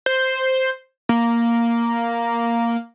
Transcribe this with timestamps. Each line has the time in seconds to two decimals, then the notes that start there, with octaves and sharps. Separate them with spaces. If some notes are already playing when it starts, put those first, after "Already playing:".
0.06 C5
1.09 A#3